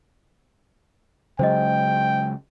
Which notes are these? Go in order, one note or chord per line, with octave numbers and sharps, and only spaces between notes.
C#3 F#3 G#3 C5 D#5 G5